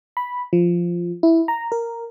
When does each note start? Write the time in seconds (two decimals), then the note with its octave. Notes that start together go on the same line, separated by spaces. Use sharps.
0.17 B5
0.53 F3
1.23 E4
1.48 A#5
1.72 A#4